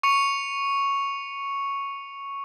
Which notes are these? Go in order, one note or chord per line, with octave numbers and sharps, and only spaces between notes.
C#6 C#7 F7